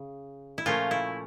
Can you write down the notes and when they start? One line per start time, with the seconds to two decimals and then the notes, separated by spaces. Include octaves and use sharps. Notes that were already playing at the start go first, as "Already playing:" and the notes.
Already playing: C#3
0.58 E4
0.66 A#2 F3 A3 C#4 F4
0.91 E4